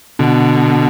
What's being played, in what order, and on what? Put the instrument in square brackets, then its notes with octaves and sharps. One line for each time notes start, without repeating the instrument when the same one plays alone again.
[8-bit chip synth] B2 D3